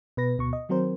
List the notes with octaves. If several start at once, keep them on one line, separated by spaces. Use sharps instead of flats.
B2 B4 A#6
D2 B2 C#6
D#5
D#3 F#3 C4 A#4 C5